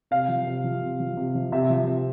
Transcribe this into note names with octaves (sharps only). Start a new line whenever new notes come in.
C3 F5
F3
C3
F3
C3
F3
C3
F3
C3 E5
F3
C3